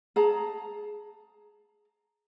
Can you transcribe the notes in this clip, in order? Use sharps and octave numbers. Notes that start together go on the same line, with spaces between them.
G#4 A5 A#5